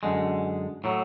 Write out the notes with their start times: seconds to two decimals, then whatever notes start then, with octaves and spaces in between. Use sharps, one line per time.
0.03 F#2 D3 G#3
0.84 A2 F#3